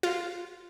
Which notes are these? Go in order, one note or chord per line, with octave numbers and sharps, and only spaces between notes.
F4